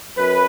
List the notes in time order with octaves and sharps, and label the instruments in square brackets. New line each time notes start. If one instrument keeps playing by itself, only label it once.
[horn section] F#2 B4